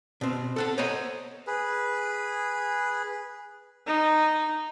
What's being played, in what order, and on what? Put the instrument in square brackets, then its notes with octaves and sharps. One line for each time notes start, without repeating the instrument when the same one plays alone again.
[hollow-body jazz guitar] B2 C4
A4 F#5 A5
C5 C#5 D#5 F#5 A#5
[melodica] G#4 B4
[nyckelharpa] D#4